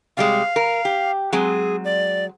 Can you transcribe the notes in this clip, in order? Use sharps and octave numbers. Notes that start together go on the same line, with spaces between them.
C3 G3 G#3 F5
A#4
G4
F#3 G#3 C4 G#4
D5